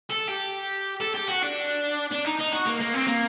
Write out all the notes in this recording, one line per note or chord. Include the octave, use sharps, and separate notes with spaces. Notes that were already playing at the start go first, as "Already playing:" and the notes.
A4
G4
A4
G4
F#4
D4
D4
D#4
D#4
F#4
A#3
A#3
C4
A#3